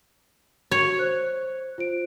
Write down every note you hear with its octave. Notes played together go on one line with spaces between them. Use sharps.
F#4 C#5
C5 F#6
F4 C5 D7